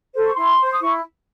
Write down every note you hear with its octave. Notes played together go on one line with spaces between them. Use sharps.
A4 C5
C#6
E4 C6
C5
D#6
E4 C#6